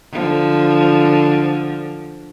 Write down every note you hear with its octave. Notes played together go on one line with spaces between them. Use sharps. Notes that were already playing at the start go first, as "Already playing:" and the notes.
D3 F3